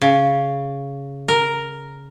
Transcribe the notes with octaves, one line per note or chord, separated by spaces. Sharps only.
C#3
A#4